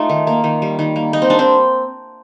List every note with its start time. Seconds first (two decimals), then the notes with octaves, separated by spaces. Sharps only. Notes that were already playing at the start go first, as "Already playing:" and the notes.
Already playing: A3 D#4 F4
0.09 D#3
0.27 A#3
0.44 D#3
0.62 G3
0.79 D#3
0.96 A#3
1.13 D#3 D#4
1.22 C4
1.30 G3 D4
1.39 C4